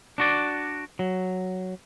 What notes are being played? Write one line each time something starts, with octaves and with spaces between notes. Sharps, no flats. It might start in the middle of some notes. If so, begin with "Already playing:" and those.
D4 F#4 D5
F#3